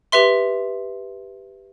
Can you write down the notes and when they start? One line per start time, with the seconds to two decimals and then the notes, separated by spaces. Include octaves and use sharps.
0.12 G4 B4 E5 C6